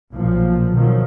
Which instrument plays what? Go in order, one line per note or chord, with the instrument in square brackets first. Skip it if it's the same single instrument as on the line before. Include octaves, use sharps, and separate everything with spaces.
[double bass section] B1 A#2 F3
B2 D#3 F3 F#3